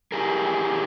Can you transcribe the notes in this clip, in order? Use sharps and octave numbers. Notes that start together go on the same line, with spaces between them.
E4 G4 G#4 A#4